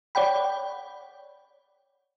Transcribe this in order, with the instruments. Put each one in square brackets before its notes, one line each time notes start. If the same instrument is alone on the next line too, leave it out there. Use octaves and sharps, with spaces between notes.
[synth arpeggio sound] C#5 D5 F#5 G5 B5